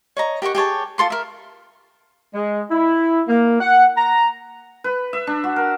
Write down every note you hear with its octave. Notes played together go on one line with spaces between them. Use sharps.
C#5 D#5 A#5
G4 A#4 F#5 C#6
G4 G#4 C#5 A5
F4 A4 C6 D6
A#4 E5
G#3
E4
A#3
F#5
A#5
B4
E5
D4
F#4
A#4